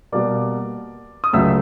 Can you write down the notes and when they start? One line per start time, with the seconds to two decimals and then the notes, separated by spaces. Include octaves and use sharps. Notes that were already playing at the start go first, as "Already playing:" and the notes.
0.12 B2 G3 A#3 D5 D6
1.24 D#6
1.33 C#2 C#3 F#3 A3 E5 E6